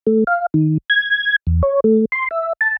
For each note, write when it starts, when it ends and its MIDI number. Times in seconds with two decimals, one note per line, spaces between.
0.07 0.24 57
0.27 0.46 77
0.54 0.78 51
0.90 1.36 92
1.47 1.62 40
1.63 1.80 73
1.84 2.05 57
2.12 2.28 84
2.31 2.53 76
2.61 2.77 81